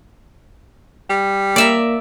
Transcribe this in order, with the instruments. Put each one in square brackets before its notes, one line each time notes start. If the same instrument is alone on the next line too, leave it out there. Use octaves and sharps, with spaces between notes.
[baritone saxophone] G3
[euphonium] A#3 [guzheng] D5 E5 A#5